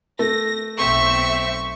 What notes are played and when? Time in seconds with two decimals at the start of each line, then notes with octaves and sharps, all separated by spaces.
0.19 A3 A#6
0.78 B1 C4 E5 C#6